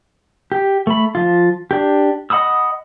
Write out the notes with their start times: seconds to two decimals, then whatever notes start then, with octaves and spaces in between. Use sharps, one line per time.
0.52 G4
0.87 A3 B5
1.15 F3 F4
1.71 D4 G4
2.30 D#5 F#5 B5 D#6 E6